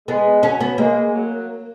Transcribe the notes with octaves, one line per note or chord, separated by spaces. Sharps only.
G#3 B3
F#3 C#4
B3
G#3 A#3
F#3